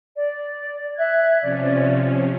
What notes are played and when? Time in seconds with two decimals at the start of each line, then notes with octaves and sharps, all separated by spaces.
0.17 D5
0.97 E5 F#6 G#6
1.41 C3 F3 C#4 D5